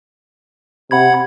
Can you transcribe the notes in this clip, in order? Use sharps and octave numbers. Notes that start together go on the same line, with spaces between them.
C3 F#5 B5 G#6